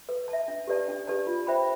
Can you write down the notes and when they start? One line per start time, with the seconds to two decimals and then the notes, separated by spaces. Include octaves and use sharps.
0.09 B4
0.28 A5
0.33 E5
0.48 D4
0.67 G4 B4 D5 A5
0.88 D4
1.07 G4 B4 D5 A5
1.27 F4
1.47 C5 E5 G5 B5